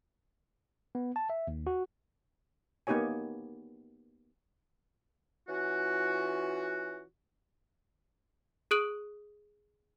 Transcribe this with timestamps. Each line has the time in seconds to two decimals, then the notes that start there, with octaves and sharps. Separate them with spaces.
0.95 B3
1.16 A5
1.30 E5
1.47 D#2
1.67 F#4
2.87 A#3 B3 D#4 G4 C#5 G#5
5.48 E3 C#4 F4 F#4
8.71 G#4 D#6 F#6 D7 F#7